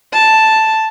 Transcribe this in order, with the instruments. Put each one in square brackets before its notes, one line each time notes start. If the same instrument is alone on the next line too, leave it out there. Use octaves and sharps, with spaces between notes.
[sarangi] A5